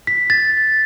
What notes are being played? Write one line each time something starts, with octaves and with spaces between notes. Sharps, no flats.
B6
A6